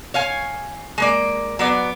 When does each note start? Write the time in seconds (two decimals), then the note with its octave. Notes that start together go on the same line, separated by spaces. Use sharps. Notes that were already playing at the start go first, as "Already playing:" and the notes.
0.14 C#5 F5 G#5
0.98 G#3 A#3 D5
1.59 F#3 B3 D5